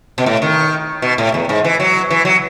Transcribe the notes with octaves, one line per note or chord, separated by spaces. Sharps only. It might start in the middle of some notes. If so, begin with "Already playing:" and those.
B2
A2
D#3
B2
A2
E2
G#2
E3
F#3
E3
F#3